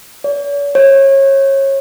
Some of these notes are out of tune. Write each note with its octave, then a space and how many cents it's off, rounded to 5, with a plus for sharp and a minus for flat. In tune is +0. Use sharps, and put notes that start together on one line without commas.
C#5 +45
C#5 -25